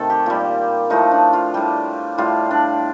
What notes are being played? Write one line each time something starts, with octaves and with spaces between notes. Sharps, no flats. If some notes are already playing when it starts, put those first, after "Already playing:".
Already playing: C3 D#3 A3 A4
G4
A#2 G3
A2 F3 A3 D#4
D4
F4
A2 G3 G4
A2 G3 F4
D4